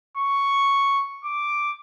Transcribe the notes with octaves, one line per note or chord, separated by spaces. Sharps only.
C#6
D6